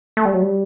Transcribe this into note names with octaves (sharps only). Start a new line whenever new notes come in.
A3
G3
F#3
G3